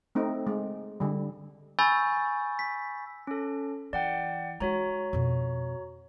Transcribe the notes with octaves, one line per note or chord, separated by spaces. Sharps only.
A3 C4 D#4
G#3
D3 G3
G#5 B5 C#6 E6 G6 A6
B6
C#4 A4
E3 D5 F#5 G5
G#3 D#4 F#4 C#5 A#5
F2 B2